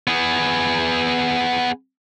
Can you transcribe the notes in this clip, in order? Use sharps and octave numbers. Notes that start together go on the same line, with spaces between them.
B3 G#4